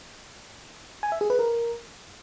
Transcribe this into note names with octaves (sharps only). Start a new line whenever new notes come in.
G#5
E5
G#4
B4
A#4